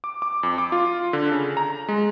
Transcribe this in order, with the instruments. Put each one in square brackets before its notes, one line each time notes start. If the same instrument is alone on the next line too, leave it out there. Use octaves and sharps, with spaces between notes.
[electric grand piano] D6
D6
F2
D6
F4
D3
C#3
A#5
G#3